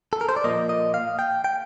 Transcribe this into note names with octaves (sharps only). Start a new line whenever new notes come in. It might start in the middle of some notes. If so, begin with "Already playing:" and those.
A4
A#4
C5
D5
A#2 F3 A#3 D#5
D#5
F5
G5
G5